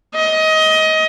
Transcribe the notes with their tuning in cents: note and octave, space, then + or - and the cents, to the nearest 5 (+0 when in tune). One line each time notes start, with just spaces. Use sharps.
D#5 +20